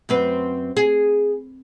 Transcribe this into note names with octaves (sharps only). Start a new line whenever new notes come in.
F#2 C4 B4
G#4